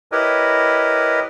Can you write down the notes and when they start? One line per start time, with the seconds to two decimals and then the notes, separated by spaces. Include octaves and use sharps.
0.12 E4 G4 A#4 B4 C#5 D#5